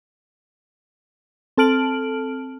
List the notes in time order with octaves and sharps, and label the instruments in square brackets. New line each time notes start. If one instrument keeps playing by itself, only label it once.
[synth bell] C4 A4 A5 F6 D7 F#7